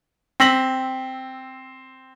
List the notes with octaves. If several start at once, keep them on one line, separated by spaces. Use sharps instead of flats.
C4 E6 A#6 B6 F#7